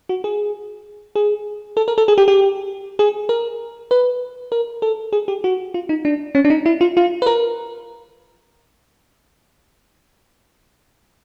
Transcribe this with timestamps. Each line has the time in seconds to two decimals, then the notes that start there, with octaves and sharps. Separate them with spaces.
0.09 F#4
0.24 G#4
1.16 G#4
1.77 A4
1.88 A#4
1.98 A4
2.08 G#4
2.18 G4
2.28 G4
2.99 G#4
3.29 A#4
3.91 B4
4.52 A#4
4.82 A4
5.13 G#4
5.28 G4
5.44 F#4
5.74 F4
5.89 D#4
6.05 D4
6.35 C#4
6.45 D4
6.50 D#4
6.66 E4
6.81 F4
6.97 F4
7.22 B4
7.26 A#4